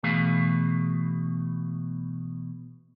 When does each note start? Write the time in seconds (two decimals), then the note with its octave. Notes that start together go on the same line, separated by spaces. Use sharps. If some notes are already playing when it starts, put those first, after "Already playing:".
0.03 B2 E3 A3 G#4 F5